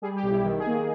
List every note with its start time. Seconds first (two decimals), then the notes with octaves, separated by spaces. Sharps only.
0.02 G3 G#4
0.16 G4
0.23 B1
0.31 E4
0.45 D#3
0.59 G#4
0.66 A#3